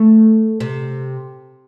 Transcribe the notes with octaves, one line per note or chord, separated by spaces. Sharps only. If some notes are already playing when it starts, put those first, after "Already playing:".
Already playing: A3
C3